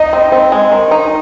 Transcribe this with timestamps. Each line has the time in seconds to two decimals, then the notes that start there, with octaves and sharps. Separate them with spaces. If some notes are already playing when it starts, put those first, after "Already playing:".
Already playing: D#4 D#5
0.13 C4
0.32 C4
0.52 G#3
0.72 D#3
0.91 D#4